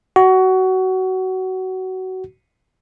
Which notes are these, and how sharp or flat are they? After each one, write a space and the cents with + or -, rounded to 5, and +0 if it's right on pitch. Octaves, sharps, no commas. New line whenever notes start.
F#4 +20